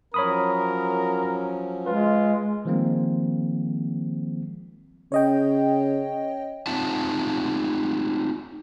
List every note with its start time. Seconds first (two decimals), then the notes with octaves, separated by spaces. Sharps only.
0.14 F3 F#3 C#4 A#4 C#5 B5 D#6
1.86 G#3 F4 B4
2.65 D#3 F3 G3 G#3 A#3 C4
5.12 C#3 C#5 D#5 G5
6.67 C4 D#4 F4 E5 F#5 A5